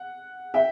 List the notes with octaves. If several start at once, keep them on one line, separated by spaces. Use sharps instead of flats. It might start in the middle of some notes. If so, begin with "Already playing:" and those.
Already playing: F#5
E5 G5